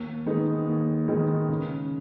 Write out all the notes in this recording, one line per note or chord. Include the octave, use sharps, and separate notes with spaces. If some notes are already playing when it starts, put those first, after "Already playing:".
Already playing: D#2
D#3 G#3 B3 D#4
D#2
D#3 G#3 B3 D#4
C#3